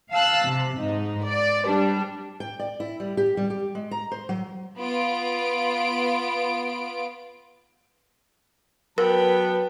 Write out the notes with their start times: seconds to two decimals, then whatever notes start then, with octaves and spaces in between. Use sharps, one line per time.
0.12 F5 A5 E6 F#6
0.47 C3
0.78 G#2 D#4
1.25 D5
1.67 G3 D4
2.40 G5
2.59 D5
2.80 E4
3.00 G3
3.17 G4
3.37 G3
3.50 G4
3.75 G#3
3.91 A#5
4.12 C5
4.29 F#3
4.77 B3 F4 D7
8.98 F#3 B3 A#4 B4 G5 A5